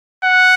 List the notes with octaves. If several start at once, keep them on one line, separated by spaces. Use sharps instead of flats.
F#5